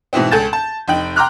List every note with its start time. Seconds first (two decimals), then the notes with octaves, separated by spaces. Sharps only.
0.13 G#2 B2 E3 B3 C4
0.31 C#2 A4 G#5 G6 A6 E7
0.53 A5
0.88 F1 D#4 G5 F#7
1.16 G5 A#5 C6 D6 F6 F#6